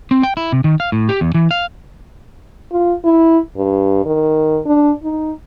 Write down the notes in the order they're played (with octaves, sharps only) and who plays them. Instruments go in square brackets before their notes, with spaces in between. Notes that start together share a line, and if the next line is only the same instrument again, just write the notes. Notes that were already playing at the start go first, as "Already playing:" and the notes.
[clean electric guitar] C4
G5
E4
C3
D#3
F5
A2
G4
E2
E3
F5
[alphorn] F4
E4
G2
D#3
D4
D#4